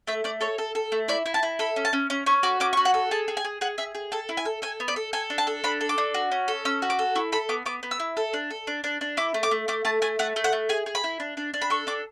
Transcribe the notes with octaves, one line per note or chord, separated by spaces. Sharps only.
A3 E5
A3 D5
A4 C#5
A4
A4
A3
E4 D5
E4
A5
E4
A4 B5
C#4
A5
C#4
C#4
C#4 C#6
F#4 D6
C#4 D6
C#6
F#4
F#5
A4
G#4 A5
G#4
G#5
G#4
G#4 F#5
G#4 E5
G#4
A4 A5
E4
G#5
A4
A4 G#5
B3
D5
A4
A4 G#5
D4
A5
A4
D4 B5
A4
D6
D4
F#4
C#4
A4
C#4 E6
F#4
D6
A4
E4 C#6
A4 B5
B3 D6
B3 D6
B3
E6
E4
A4
D4
A4
D4
D4
D4
E4 D6
A3
D6
A3
A3 D6
A3 A5
A3 G#5
A3 F#5
A3
F#5
A3
G#4 G#5
G#4
B5
E4
D4
D4
D4
B5
A4 C#6
D4 D6